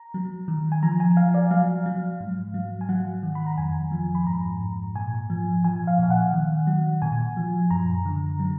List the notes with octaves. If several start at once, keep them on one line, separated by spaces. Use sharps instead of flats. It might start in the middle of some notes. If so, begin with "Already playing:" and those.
Already playing: A#5
F#3
D#3
G#5
F3 A#5
G#5
F3 F5
D5
F#3 F5
F#3
G#2
F#3
G#5
F#3 F#5
D#3
B5
A#5
F2 G#5
F3
B5
G#2 A#5
G#2
A#2 G#5
F3
F3 G#5
F5
A#2 F5
F#5
D#3
F#3
A#2 G#5
F3
F#2 A#5
D3
F#3